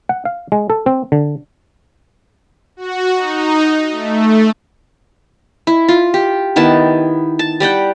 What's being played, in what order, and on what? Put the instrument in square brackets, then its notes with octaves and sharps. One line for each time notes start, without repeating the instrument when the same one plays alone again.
[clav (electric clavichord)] F#5
F5
G#3
A4
C4
D3
[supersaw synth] F#4
D#4
A3
[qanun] E4
F4
G4
D#3 B3 E4 A5
A5
G3 D5 F#5 G5